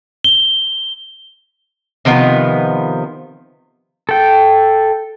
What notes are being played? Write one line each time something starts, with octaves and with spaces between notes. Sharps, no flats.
G7
C3 D#3 F3 B3
A4 G5